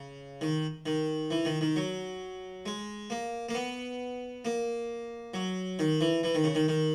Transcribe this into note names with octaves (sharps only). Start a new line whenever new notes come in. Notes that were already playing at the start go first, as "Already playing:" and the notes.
Already playing: C#3
D#3
D#3
E3
D#3
D#3
F#3
G#3
A#3
A#3
B3
A#3
F#3
D#3
E3
E3
D#3
C#3
D#3
D#3